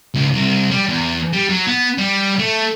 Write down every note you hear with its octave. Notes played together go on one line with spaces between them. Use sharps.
C#2
C2
G3
E2
G3
F#3
B3
G3
A3